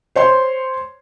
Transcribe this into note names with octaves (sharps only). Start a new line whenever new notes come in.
C5 C#5 C6